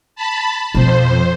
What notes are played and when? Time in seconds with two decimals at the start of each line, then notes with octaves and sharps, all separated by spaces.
0.16 A5 B5
0.74 F2 B2 F3 C5